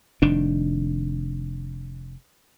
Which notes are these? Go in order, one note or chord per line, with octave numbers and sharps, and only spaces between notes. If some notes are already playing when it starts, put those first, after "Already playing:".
F1 D#3 D4